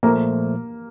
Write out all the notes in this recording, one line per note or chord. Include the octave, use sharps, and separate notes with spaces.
A#2 F3 A3 A#3